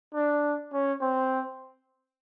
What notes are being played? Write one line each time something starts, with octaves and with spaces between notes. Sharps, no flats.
D4
C#4
C4